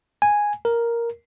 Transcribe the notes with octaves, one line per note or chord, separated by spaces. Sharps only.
G#5
A#4